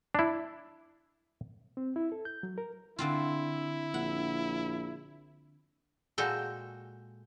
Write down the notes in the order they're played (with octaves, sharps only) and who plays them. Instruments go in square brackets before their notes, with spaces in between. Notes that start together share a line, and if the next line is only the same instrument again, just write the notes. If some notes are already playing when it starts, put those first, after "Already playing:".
[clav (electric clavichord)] D4 E4
[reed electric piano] C4
E4
A4
G6
F#3
A#4
[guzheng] D3 C4 F4 [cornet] E4
[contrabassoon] A#1 [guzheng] F#5
[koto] A#2 G#3 F#4 A4 G5